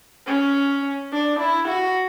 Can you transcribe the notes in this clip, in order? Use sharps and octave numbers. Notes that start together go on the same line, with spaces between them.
C#4
D4
E4
F#4